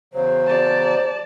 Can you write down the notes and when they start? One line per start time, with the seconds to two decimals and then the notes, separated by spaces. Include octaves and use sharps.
0.14 E2 C#3 F#3 C5
0.47 D5 A5